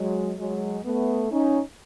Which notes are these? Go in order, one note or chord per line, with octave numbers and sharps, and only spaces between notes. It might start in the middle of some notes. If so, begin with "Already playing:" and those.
Already playing: F#3 G#3
F#3 G#3
A3 B3
C#4 D#4